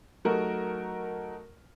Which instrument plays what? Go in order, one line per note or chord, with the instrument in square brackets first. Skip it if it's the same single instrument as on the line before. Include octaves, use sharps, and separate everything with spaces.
[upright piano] F#3 A3 D#4 F#4 A#4